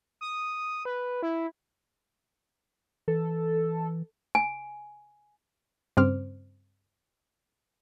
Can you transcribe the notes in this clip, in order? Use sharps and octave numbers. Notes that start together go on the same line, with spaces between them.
D#6
B4
E4
E3 A4
G#5
G2 C#3 C4 C5 D6 F6